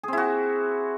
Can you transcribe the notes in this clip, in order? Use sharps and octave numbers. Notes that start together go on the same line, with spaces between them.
C4 E4 F#4 G#4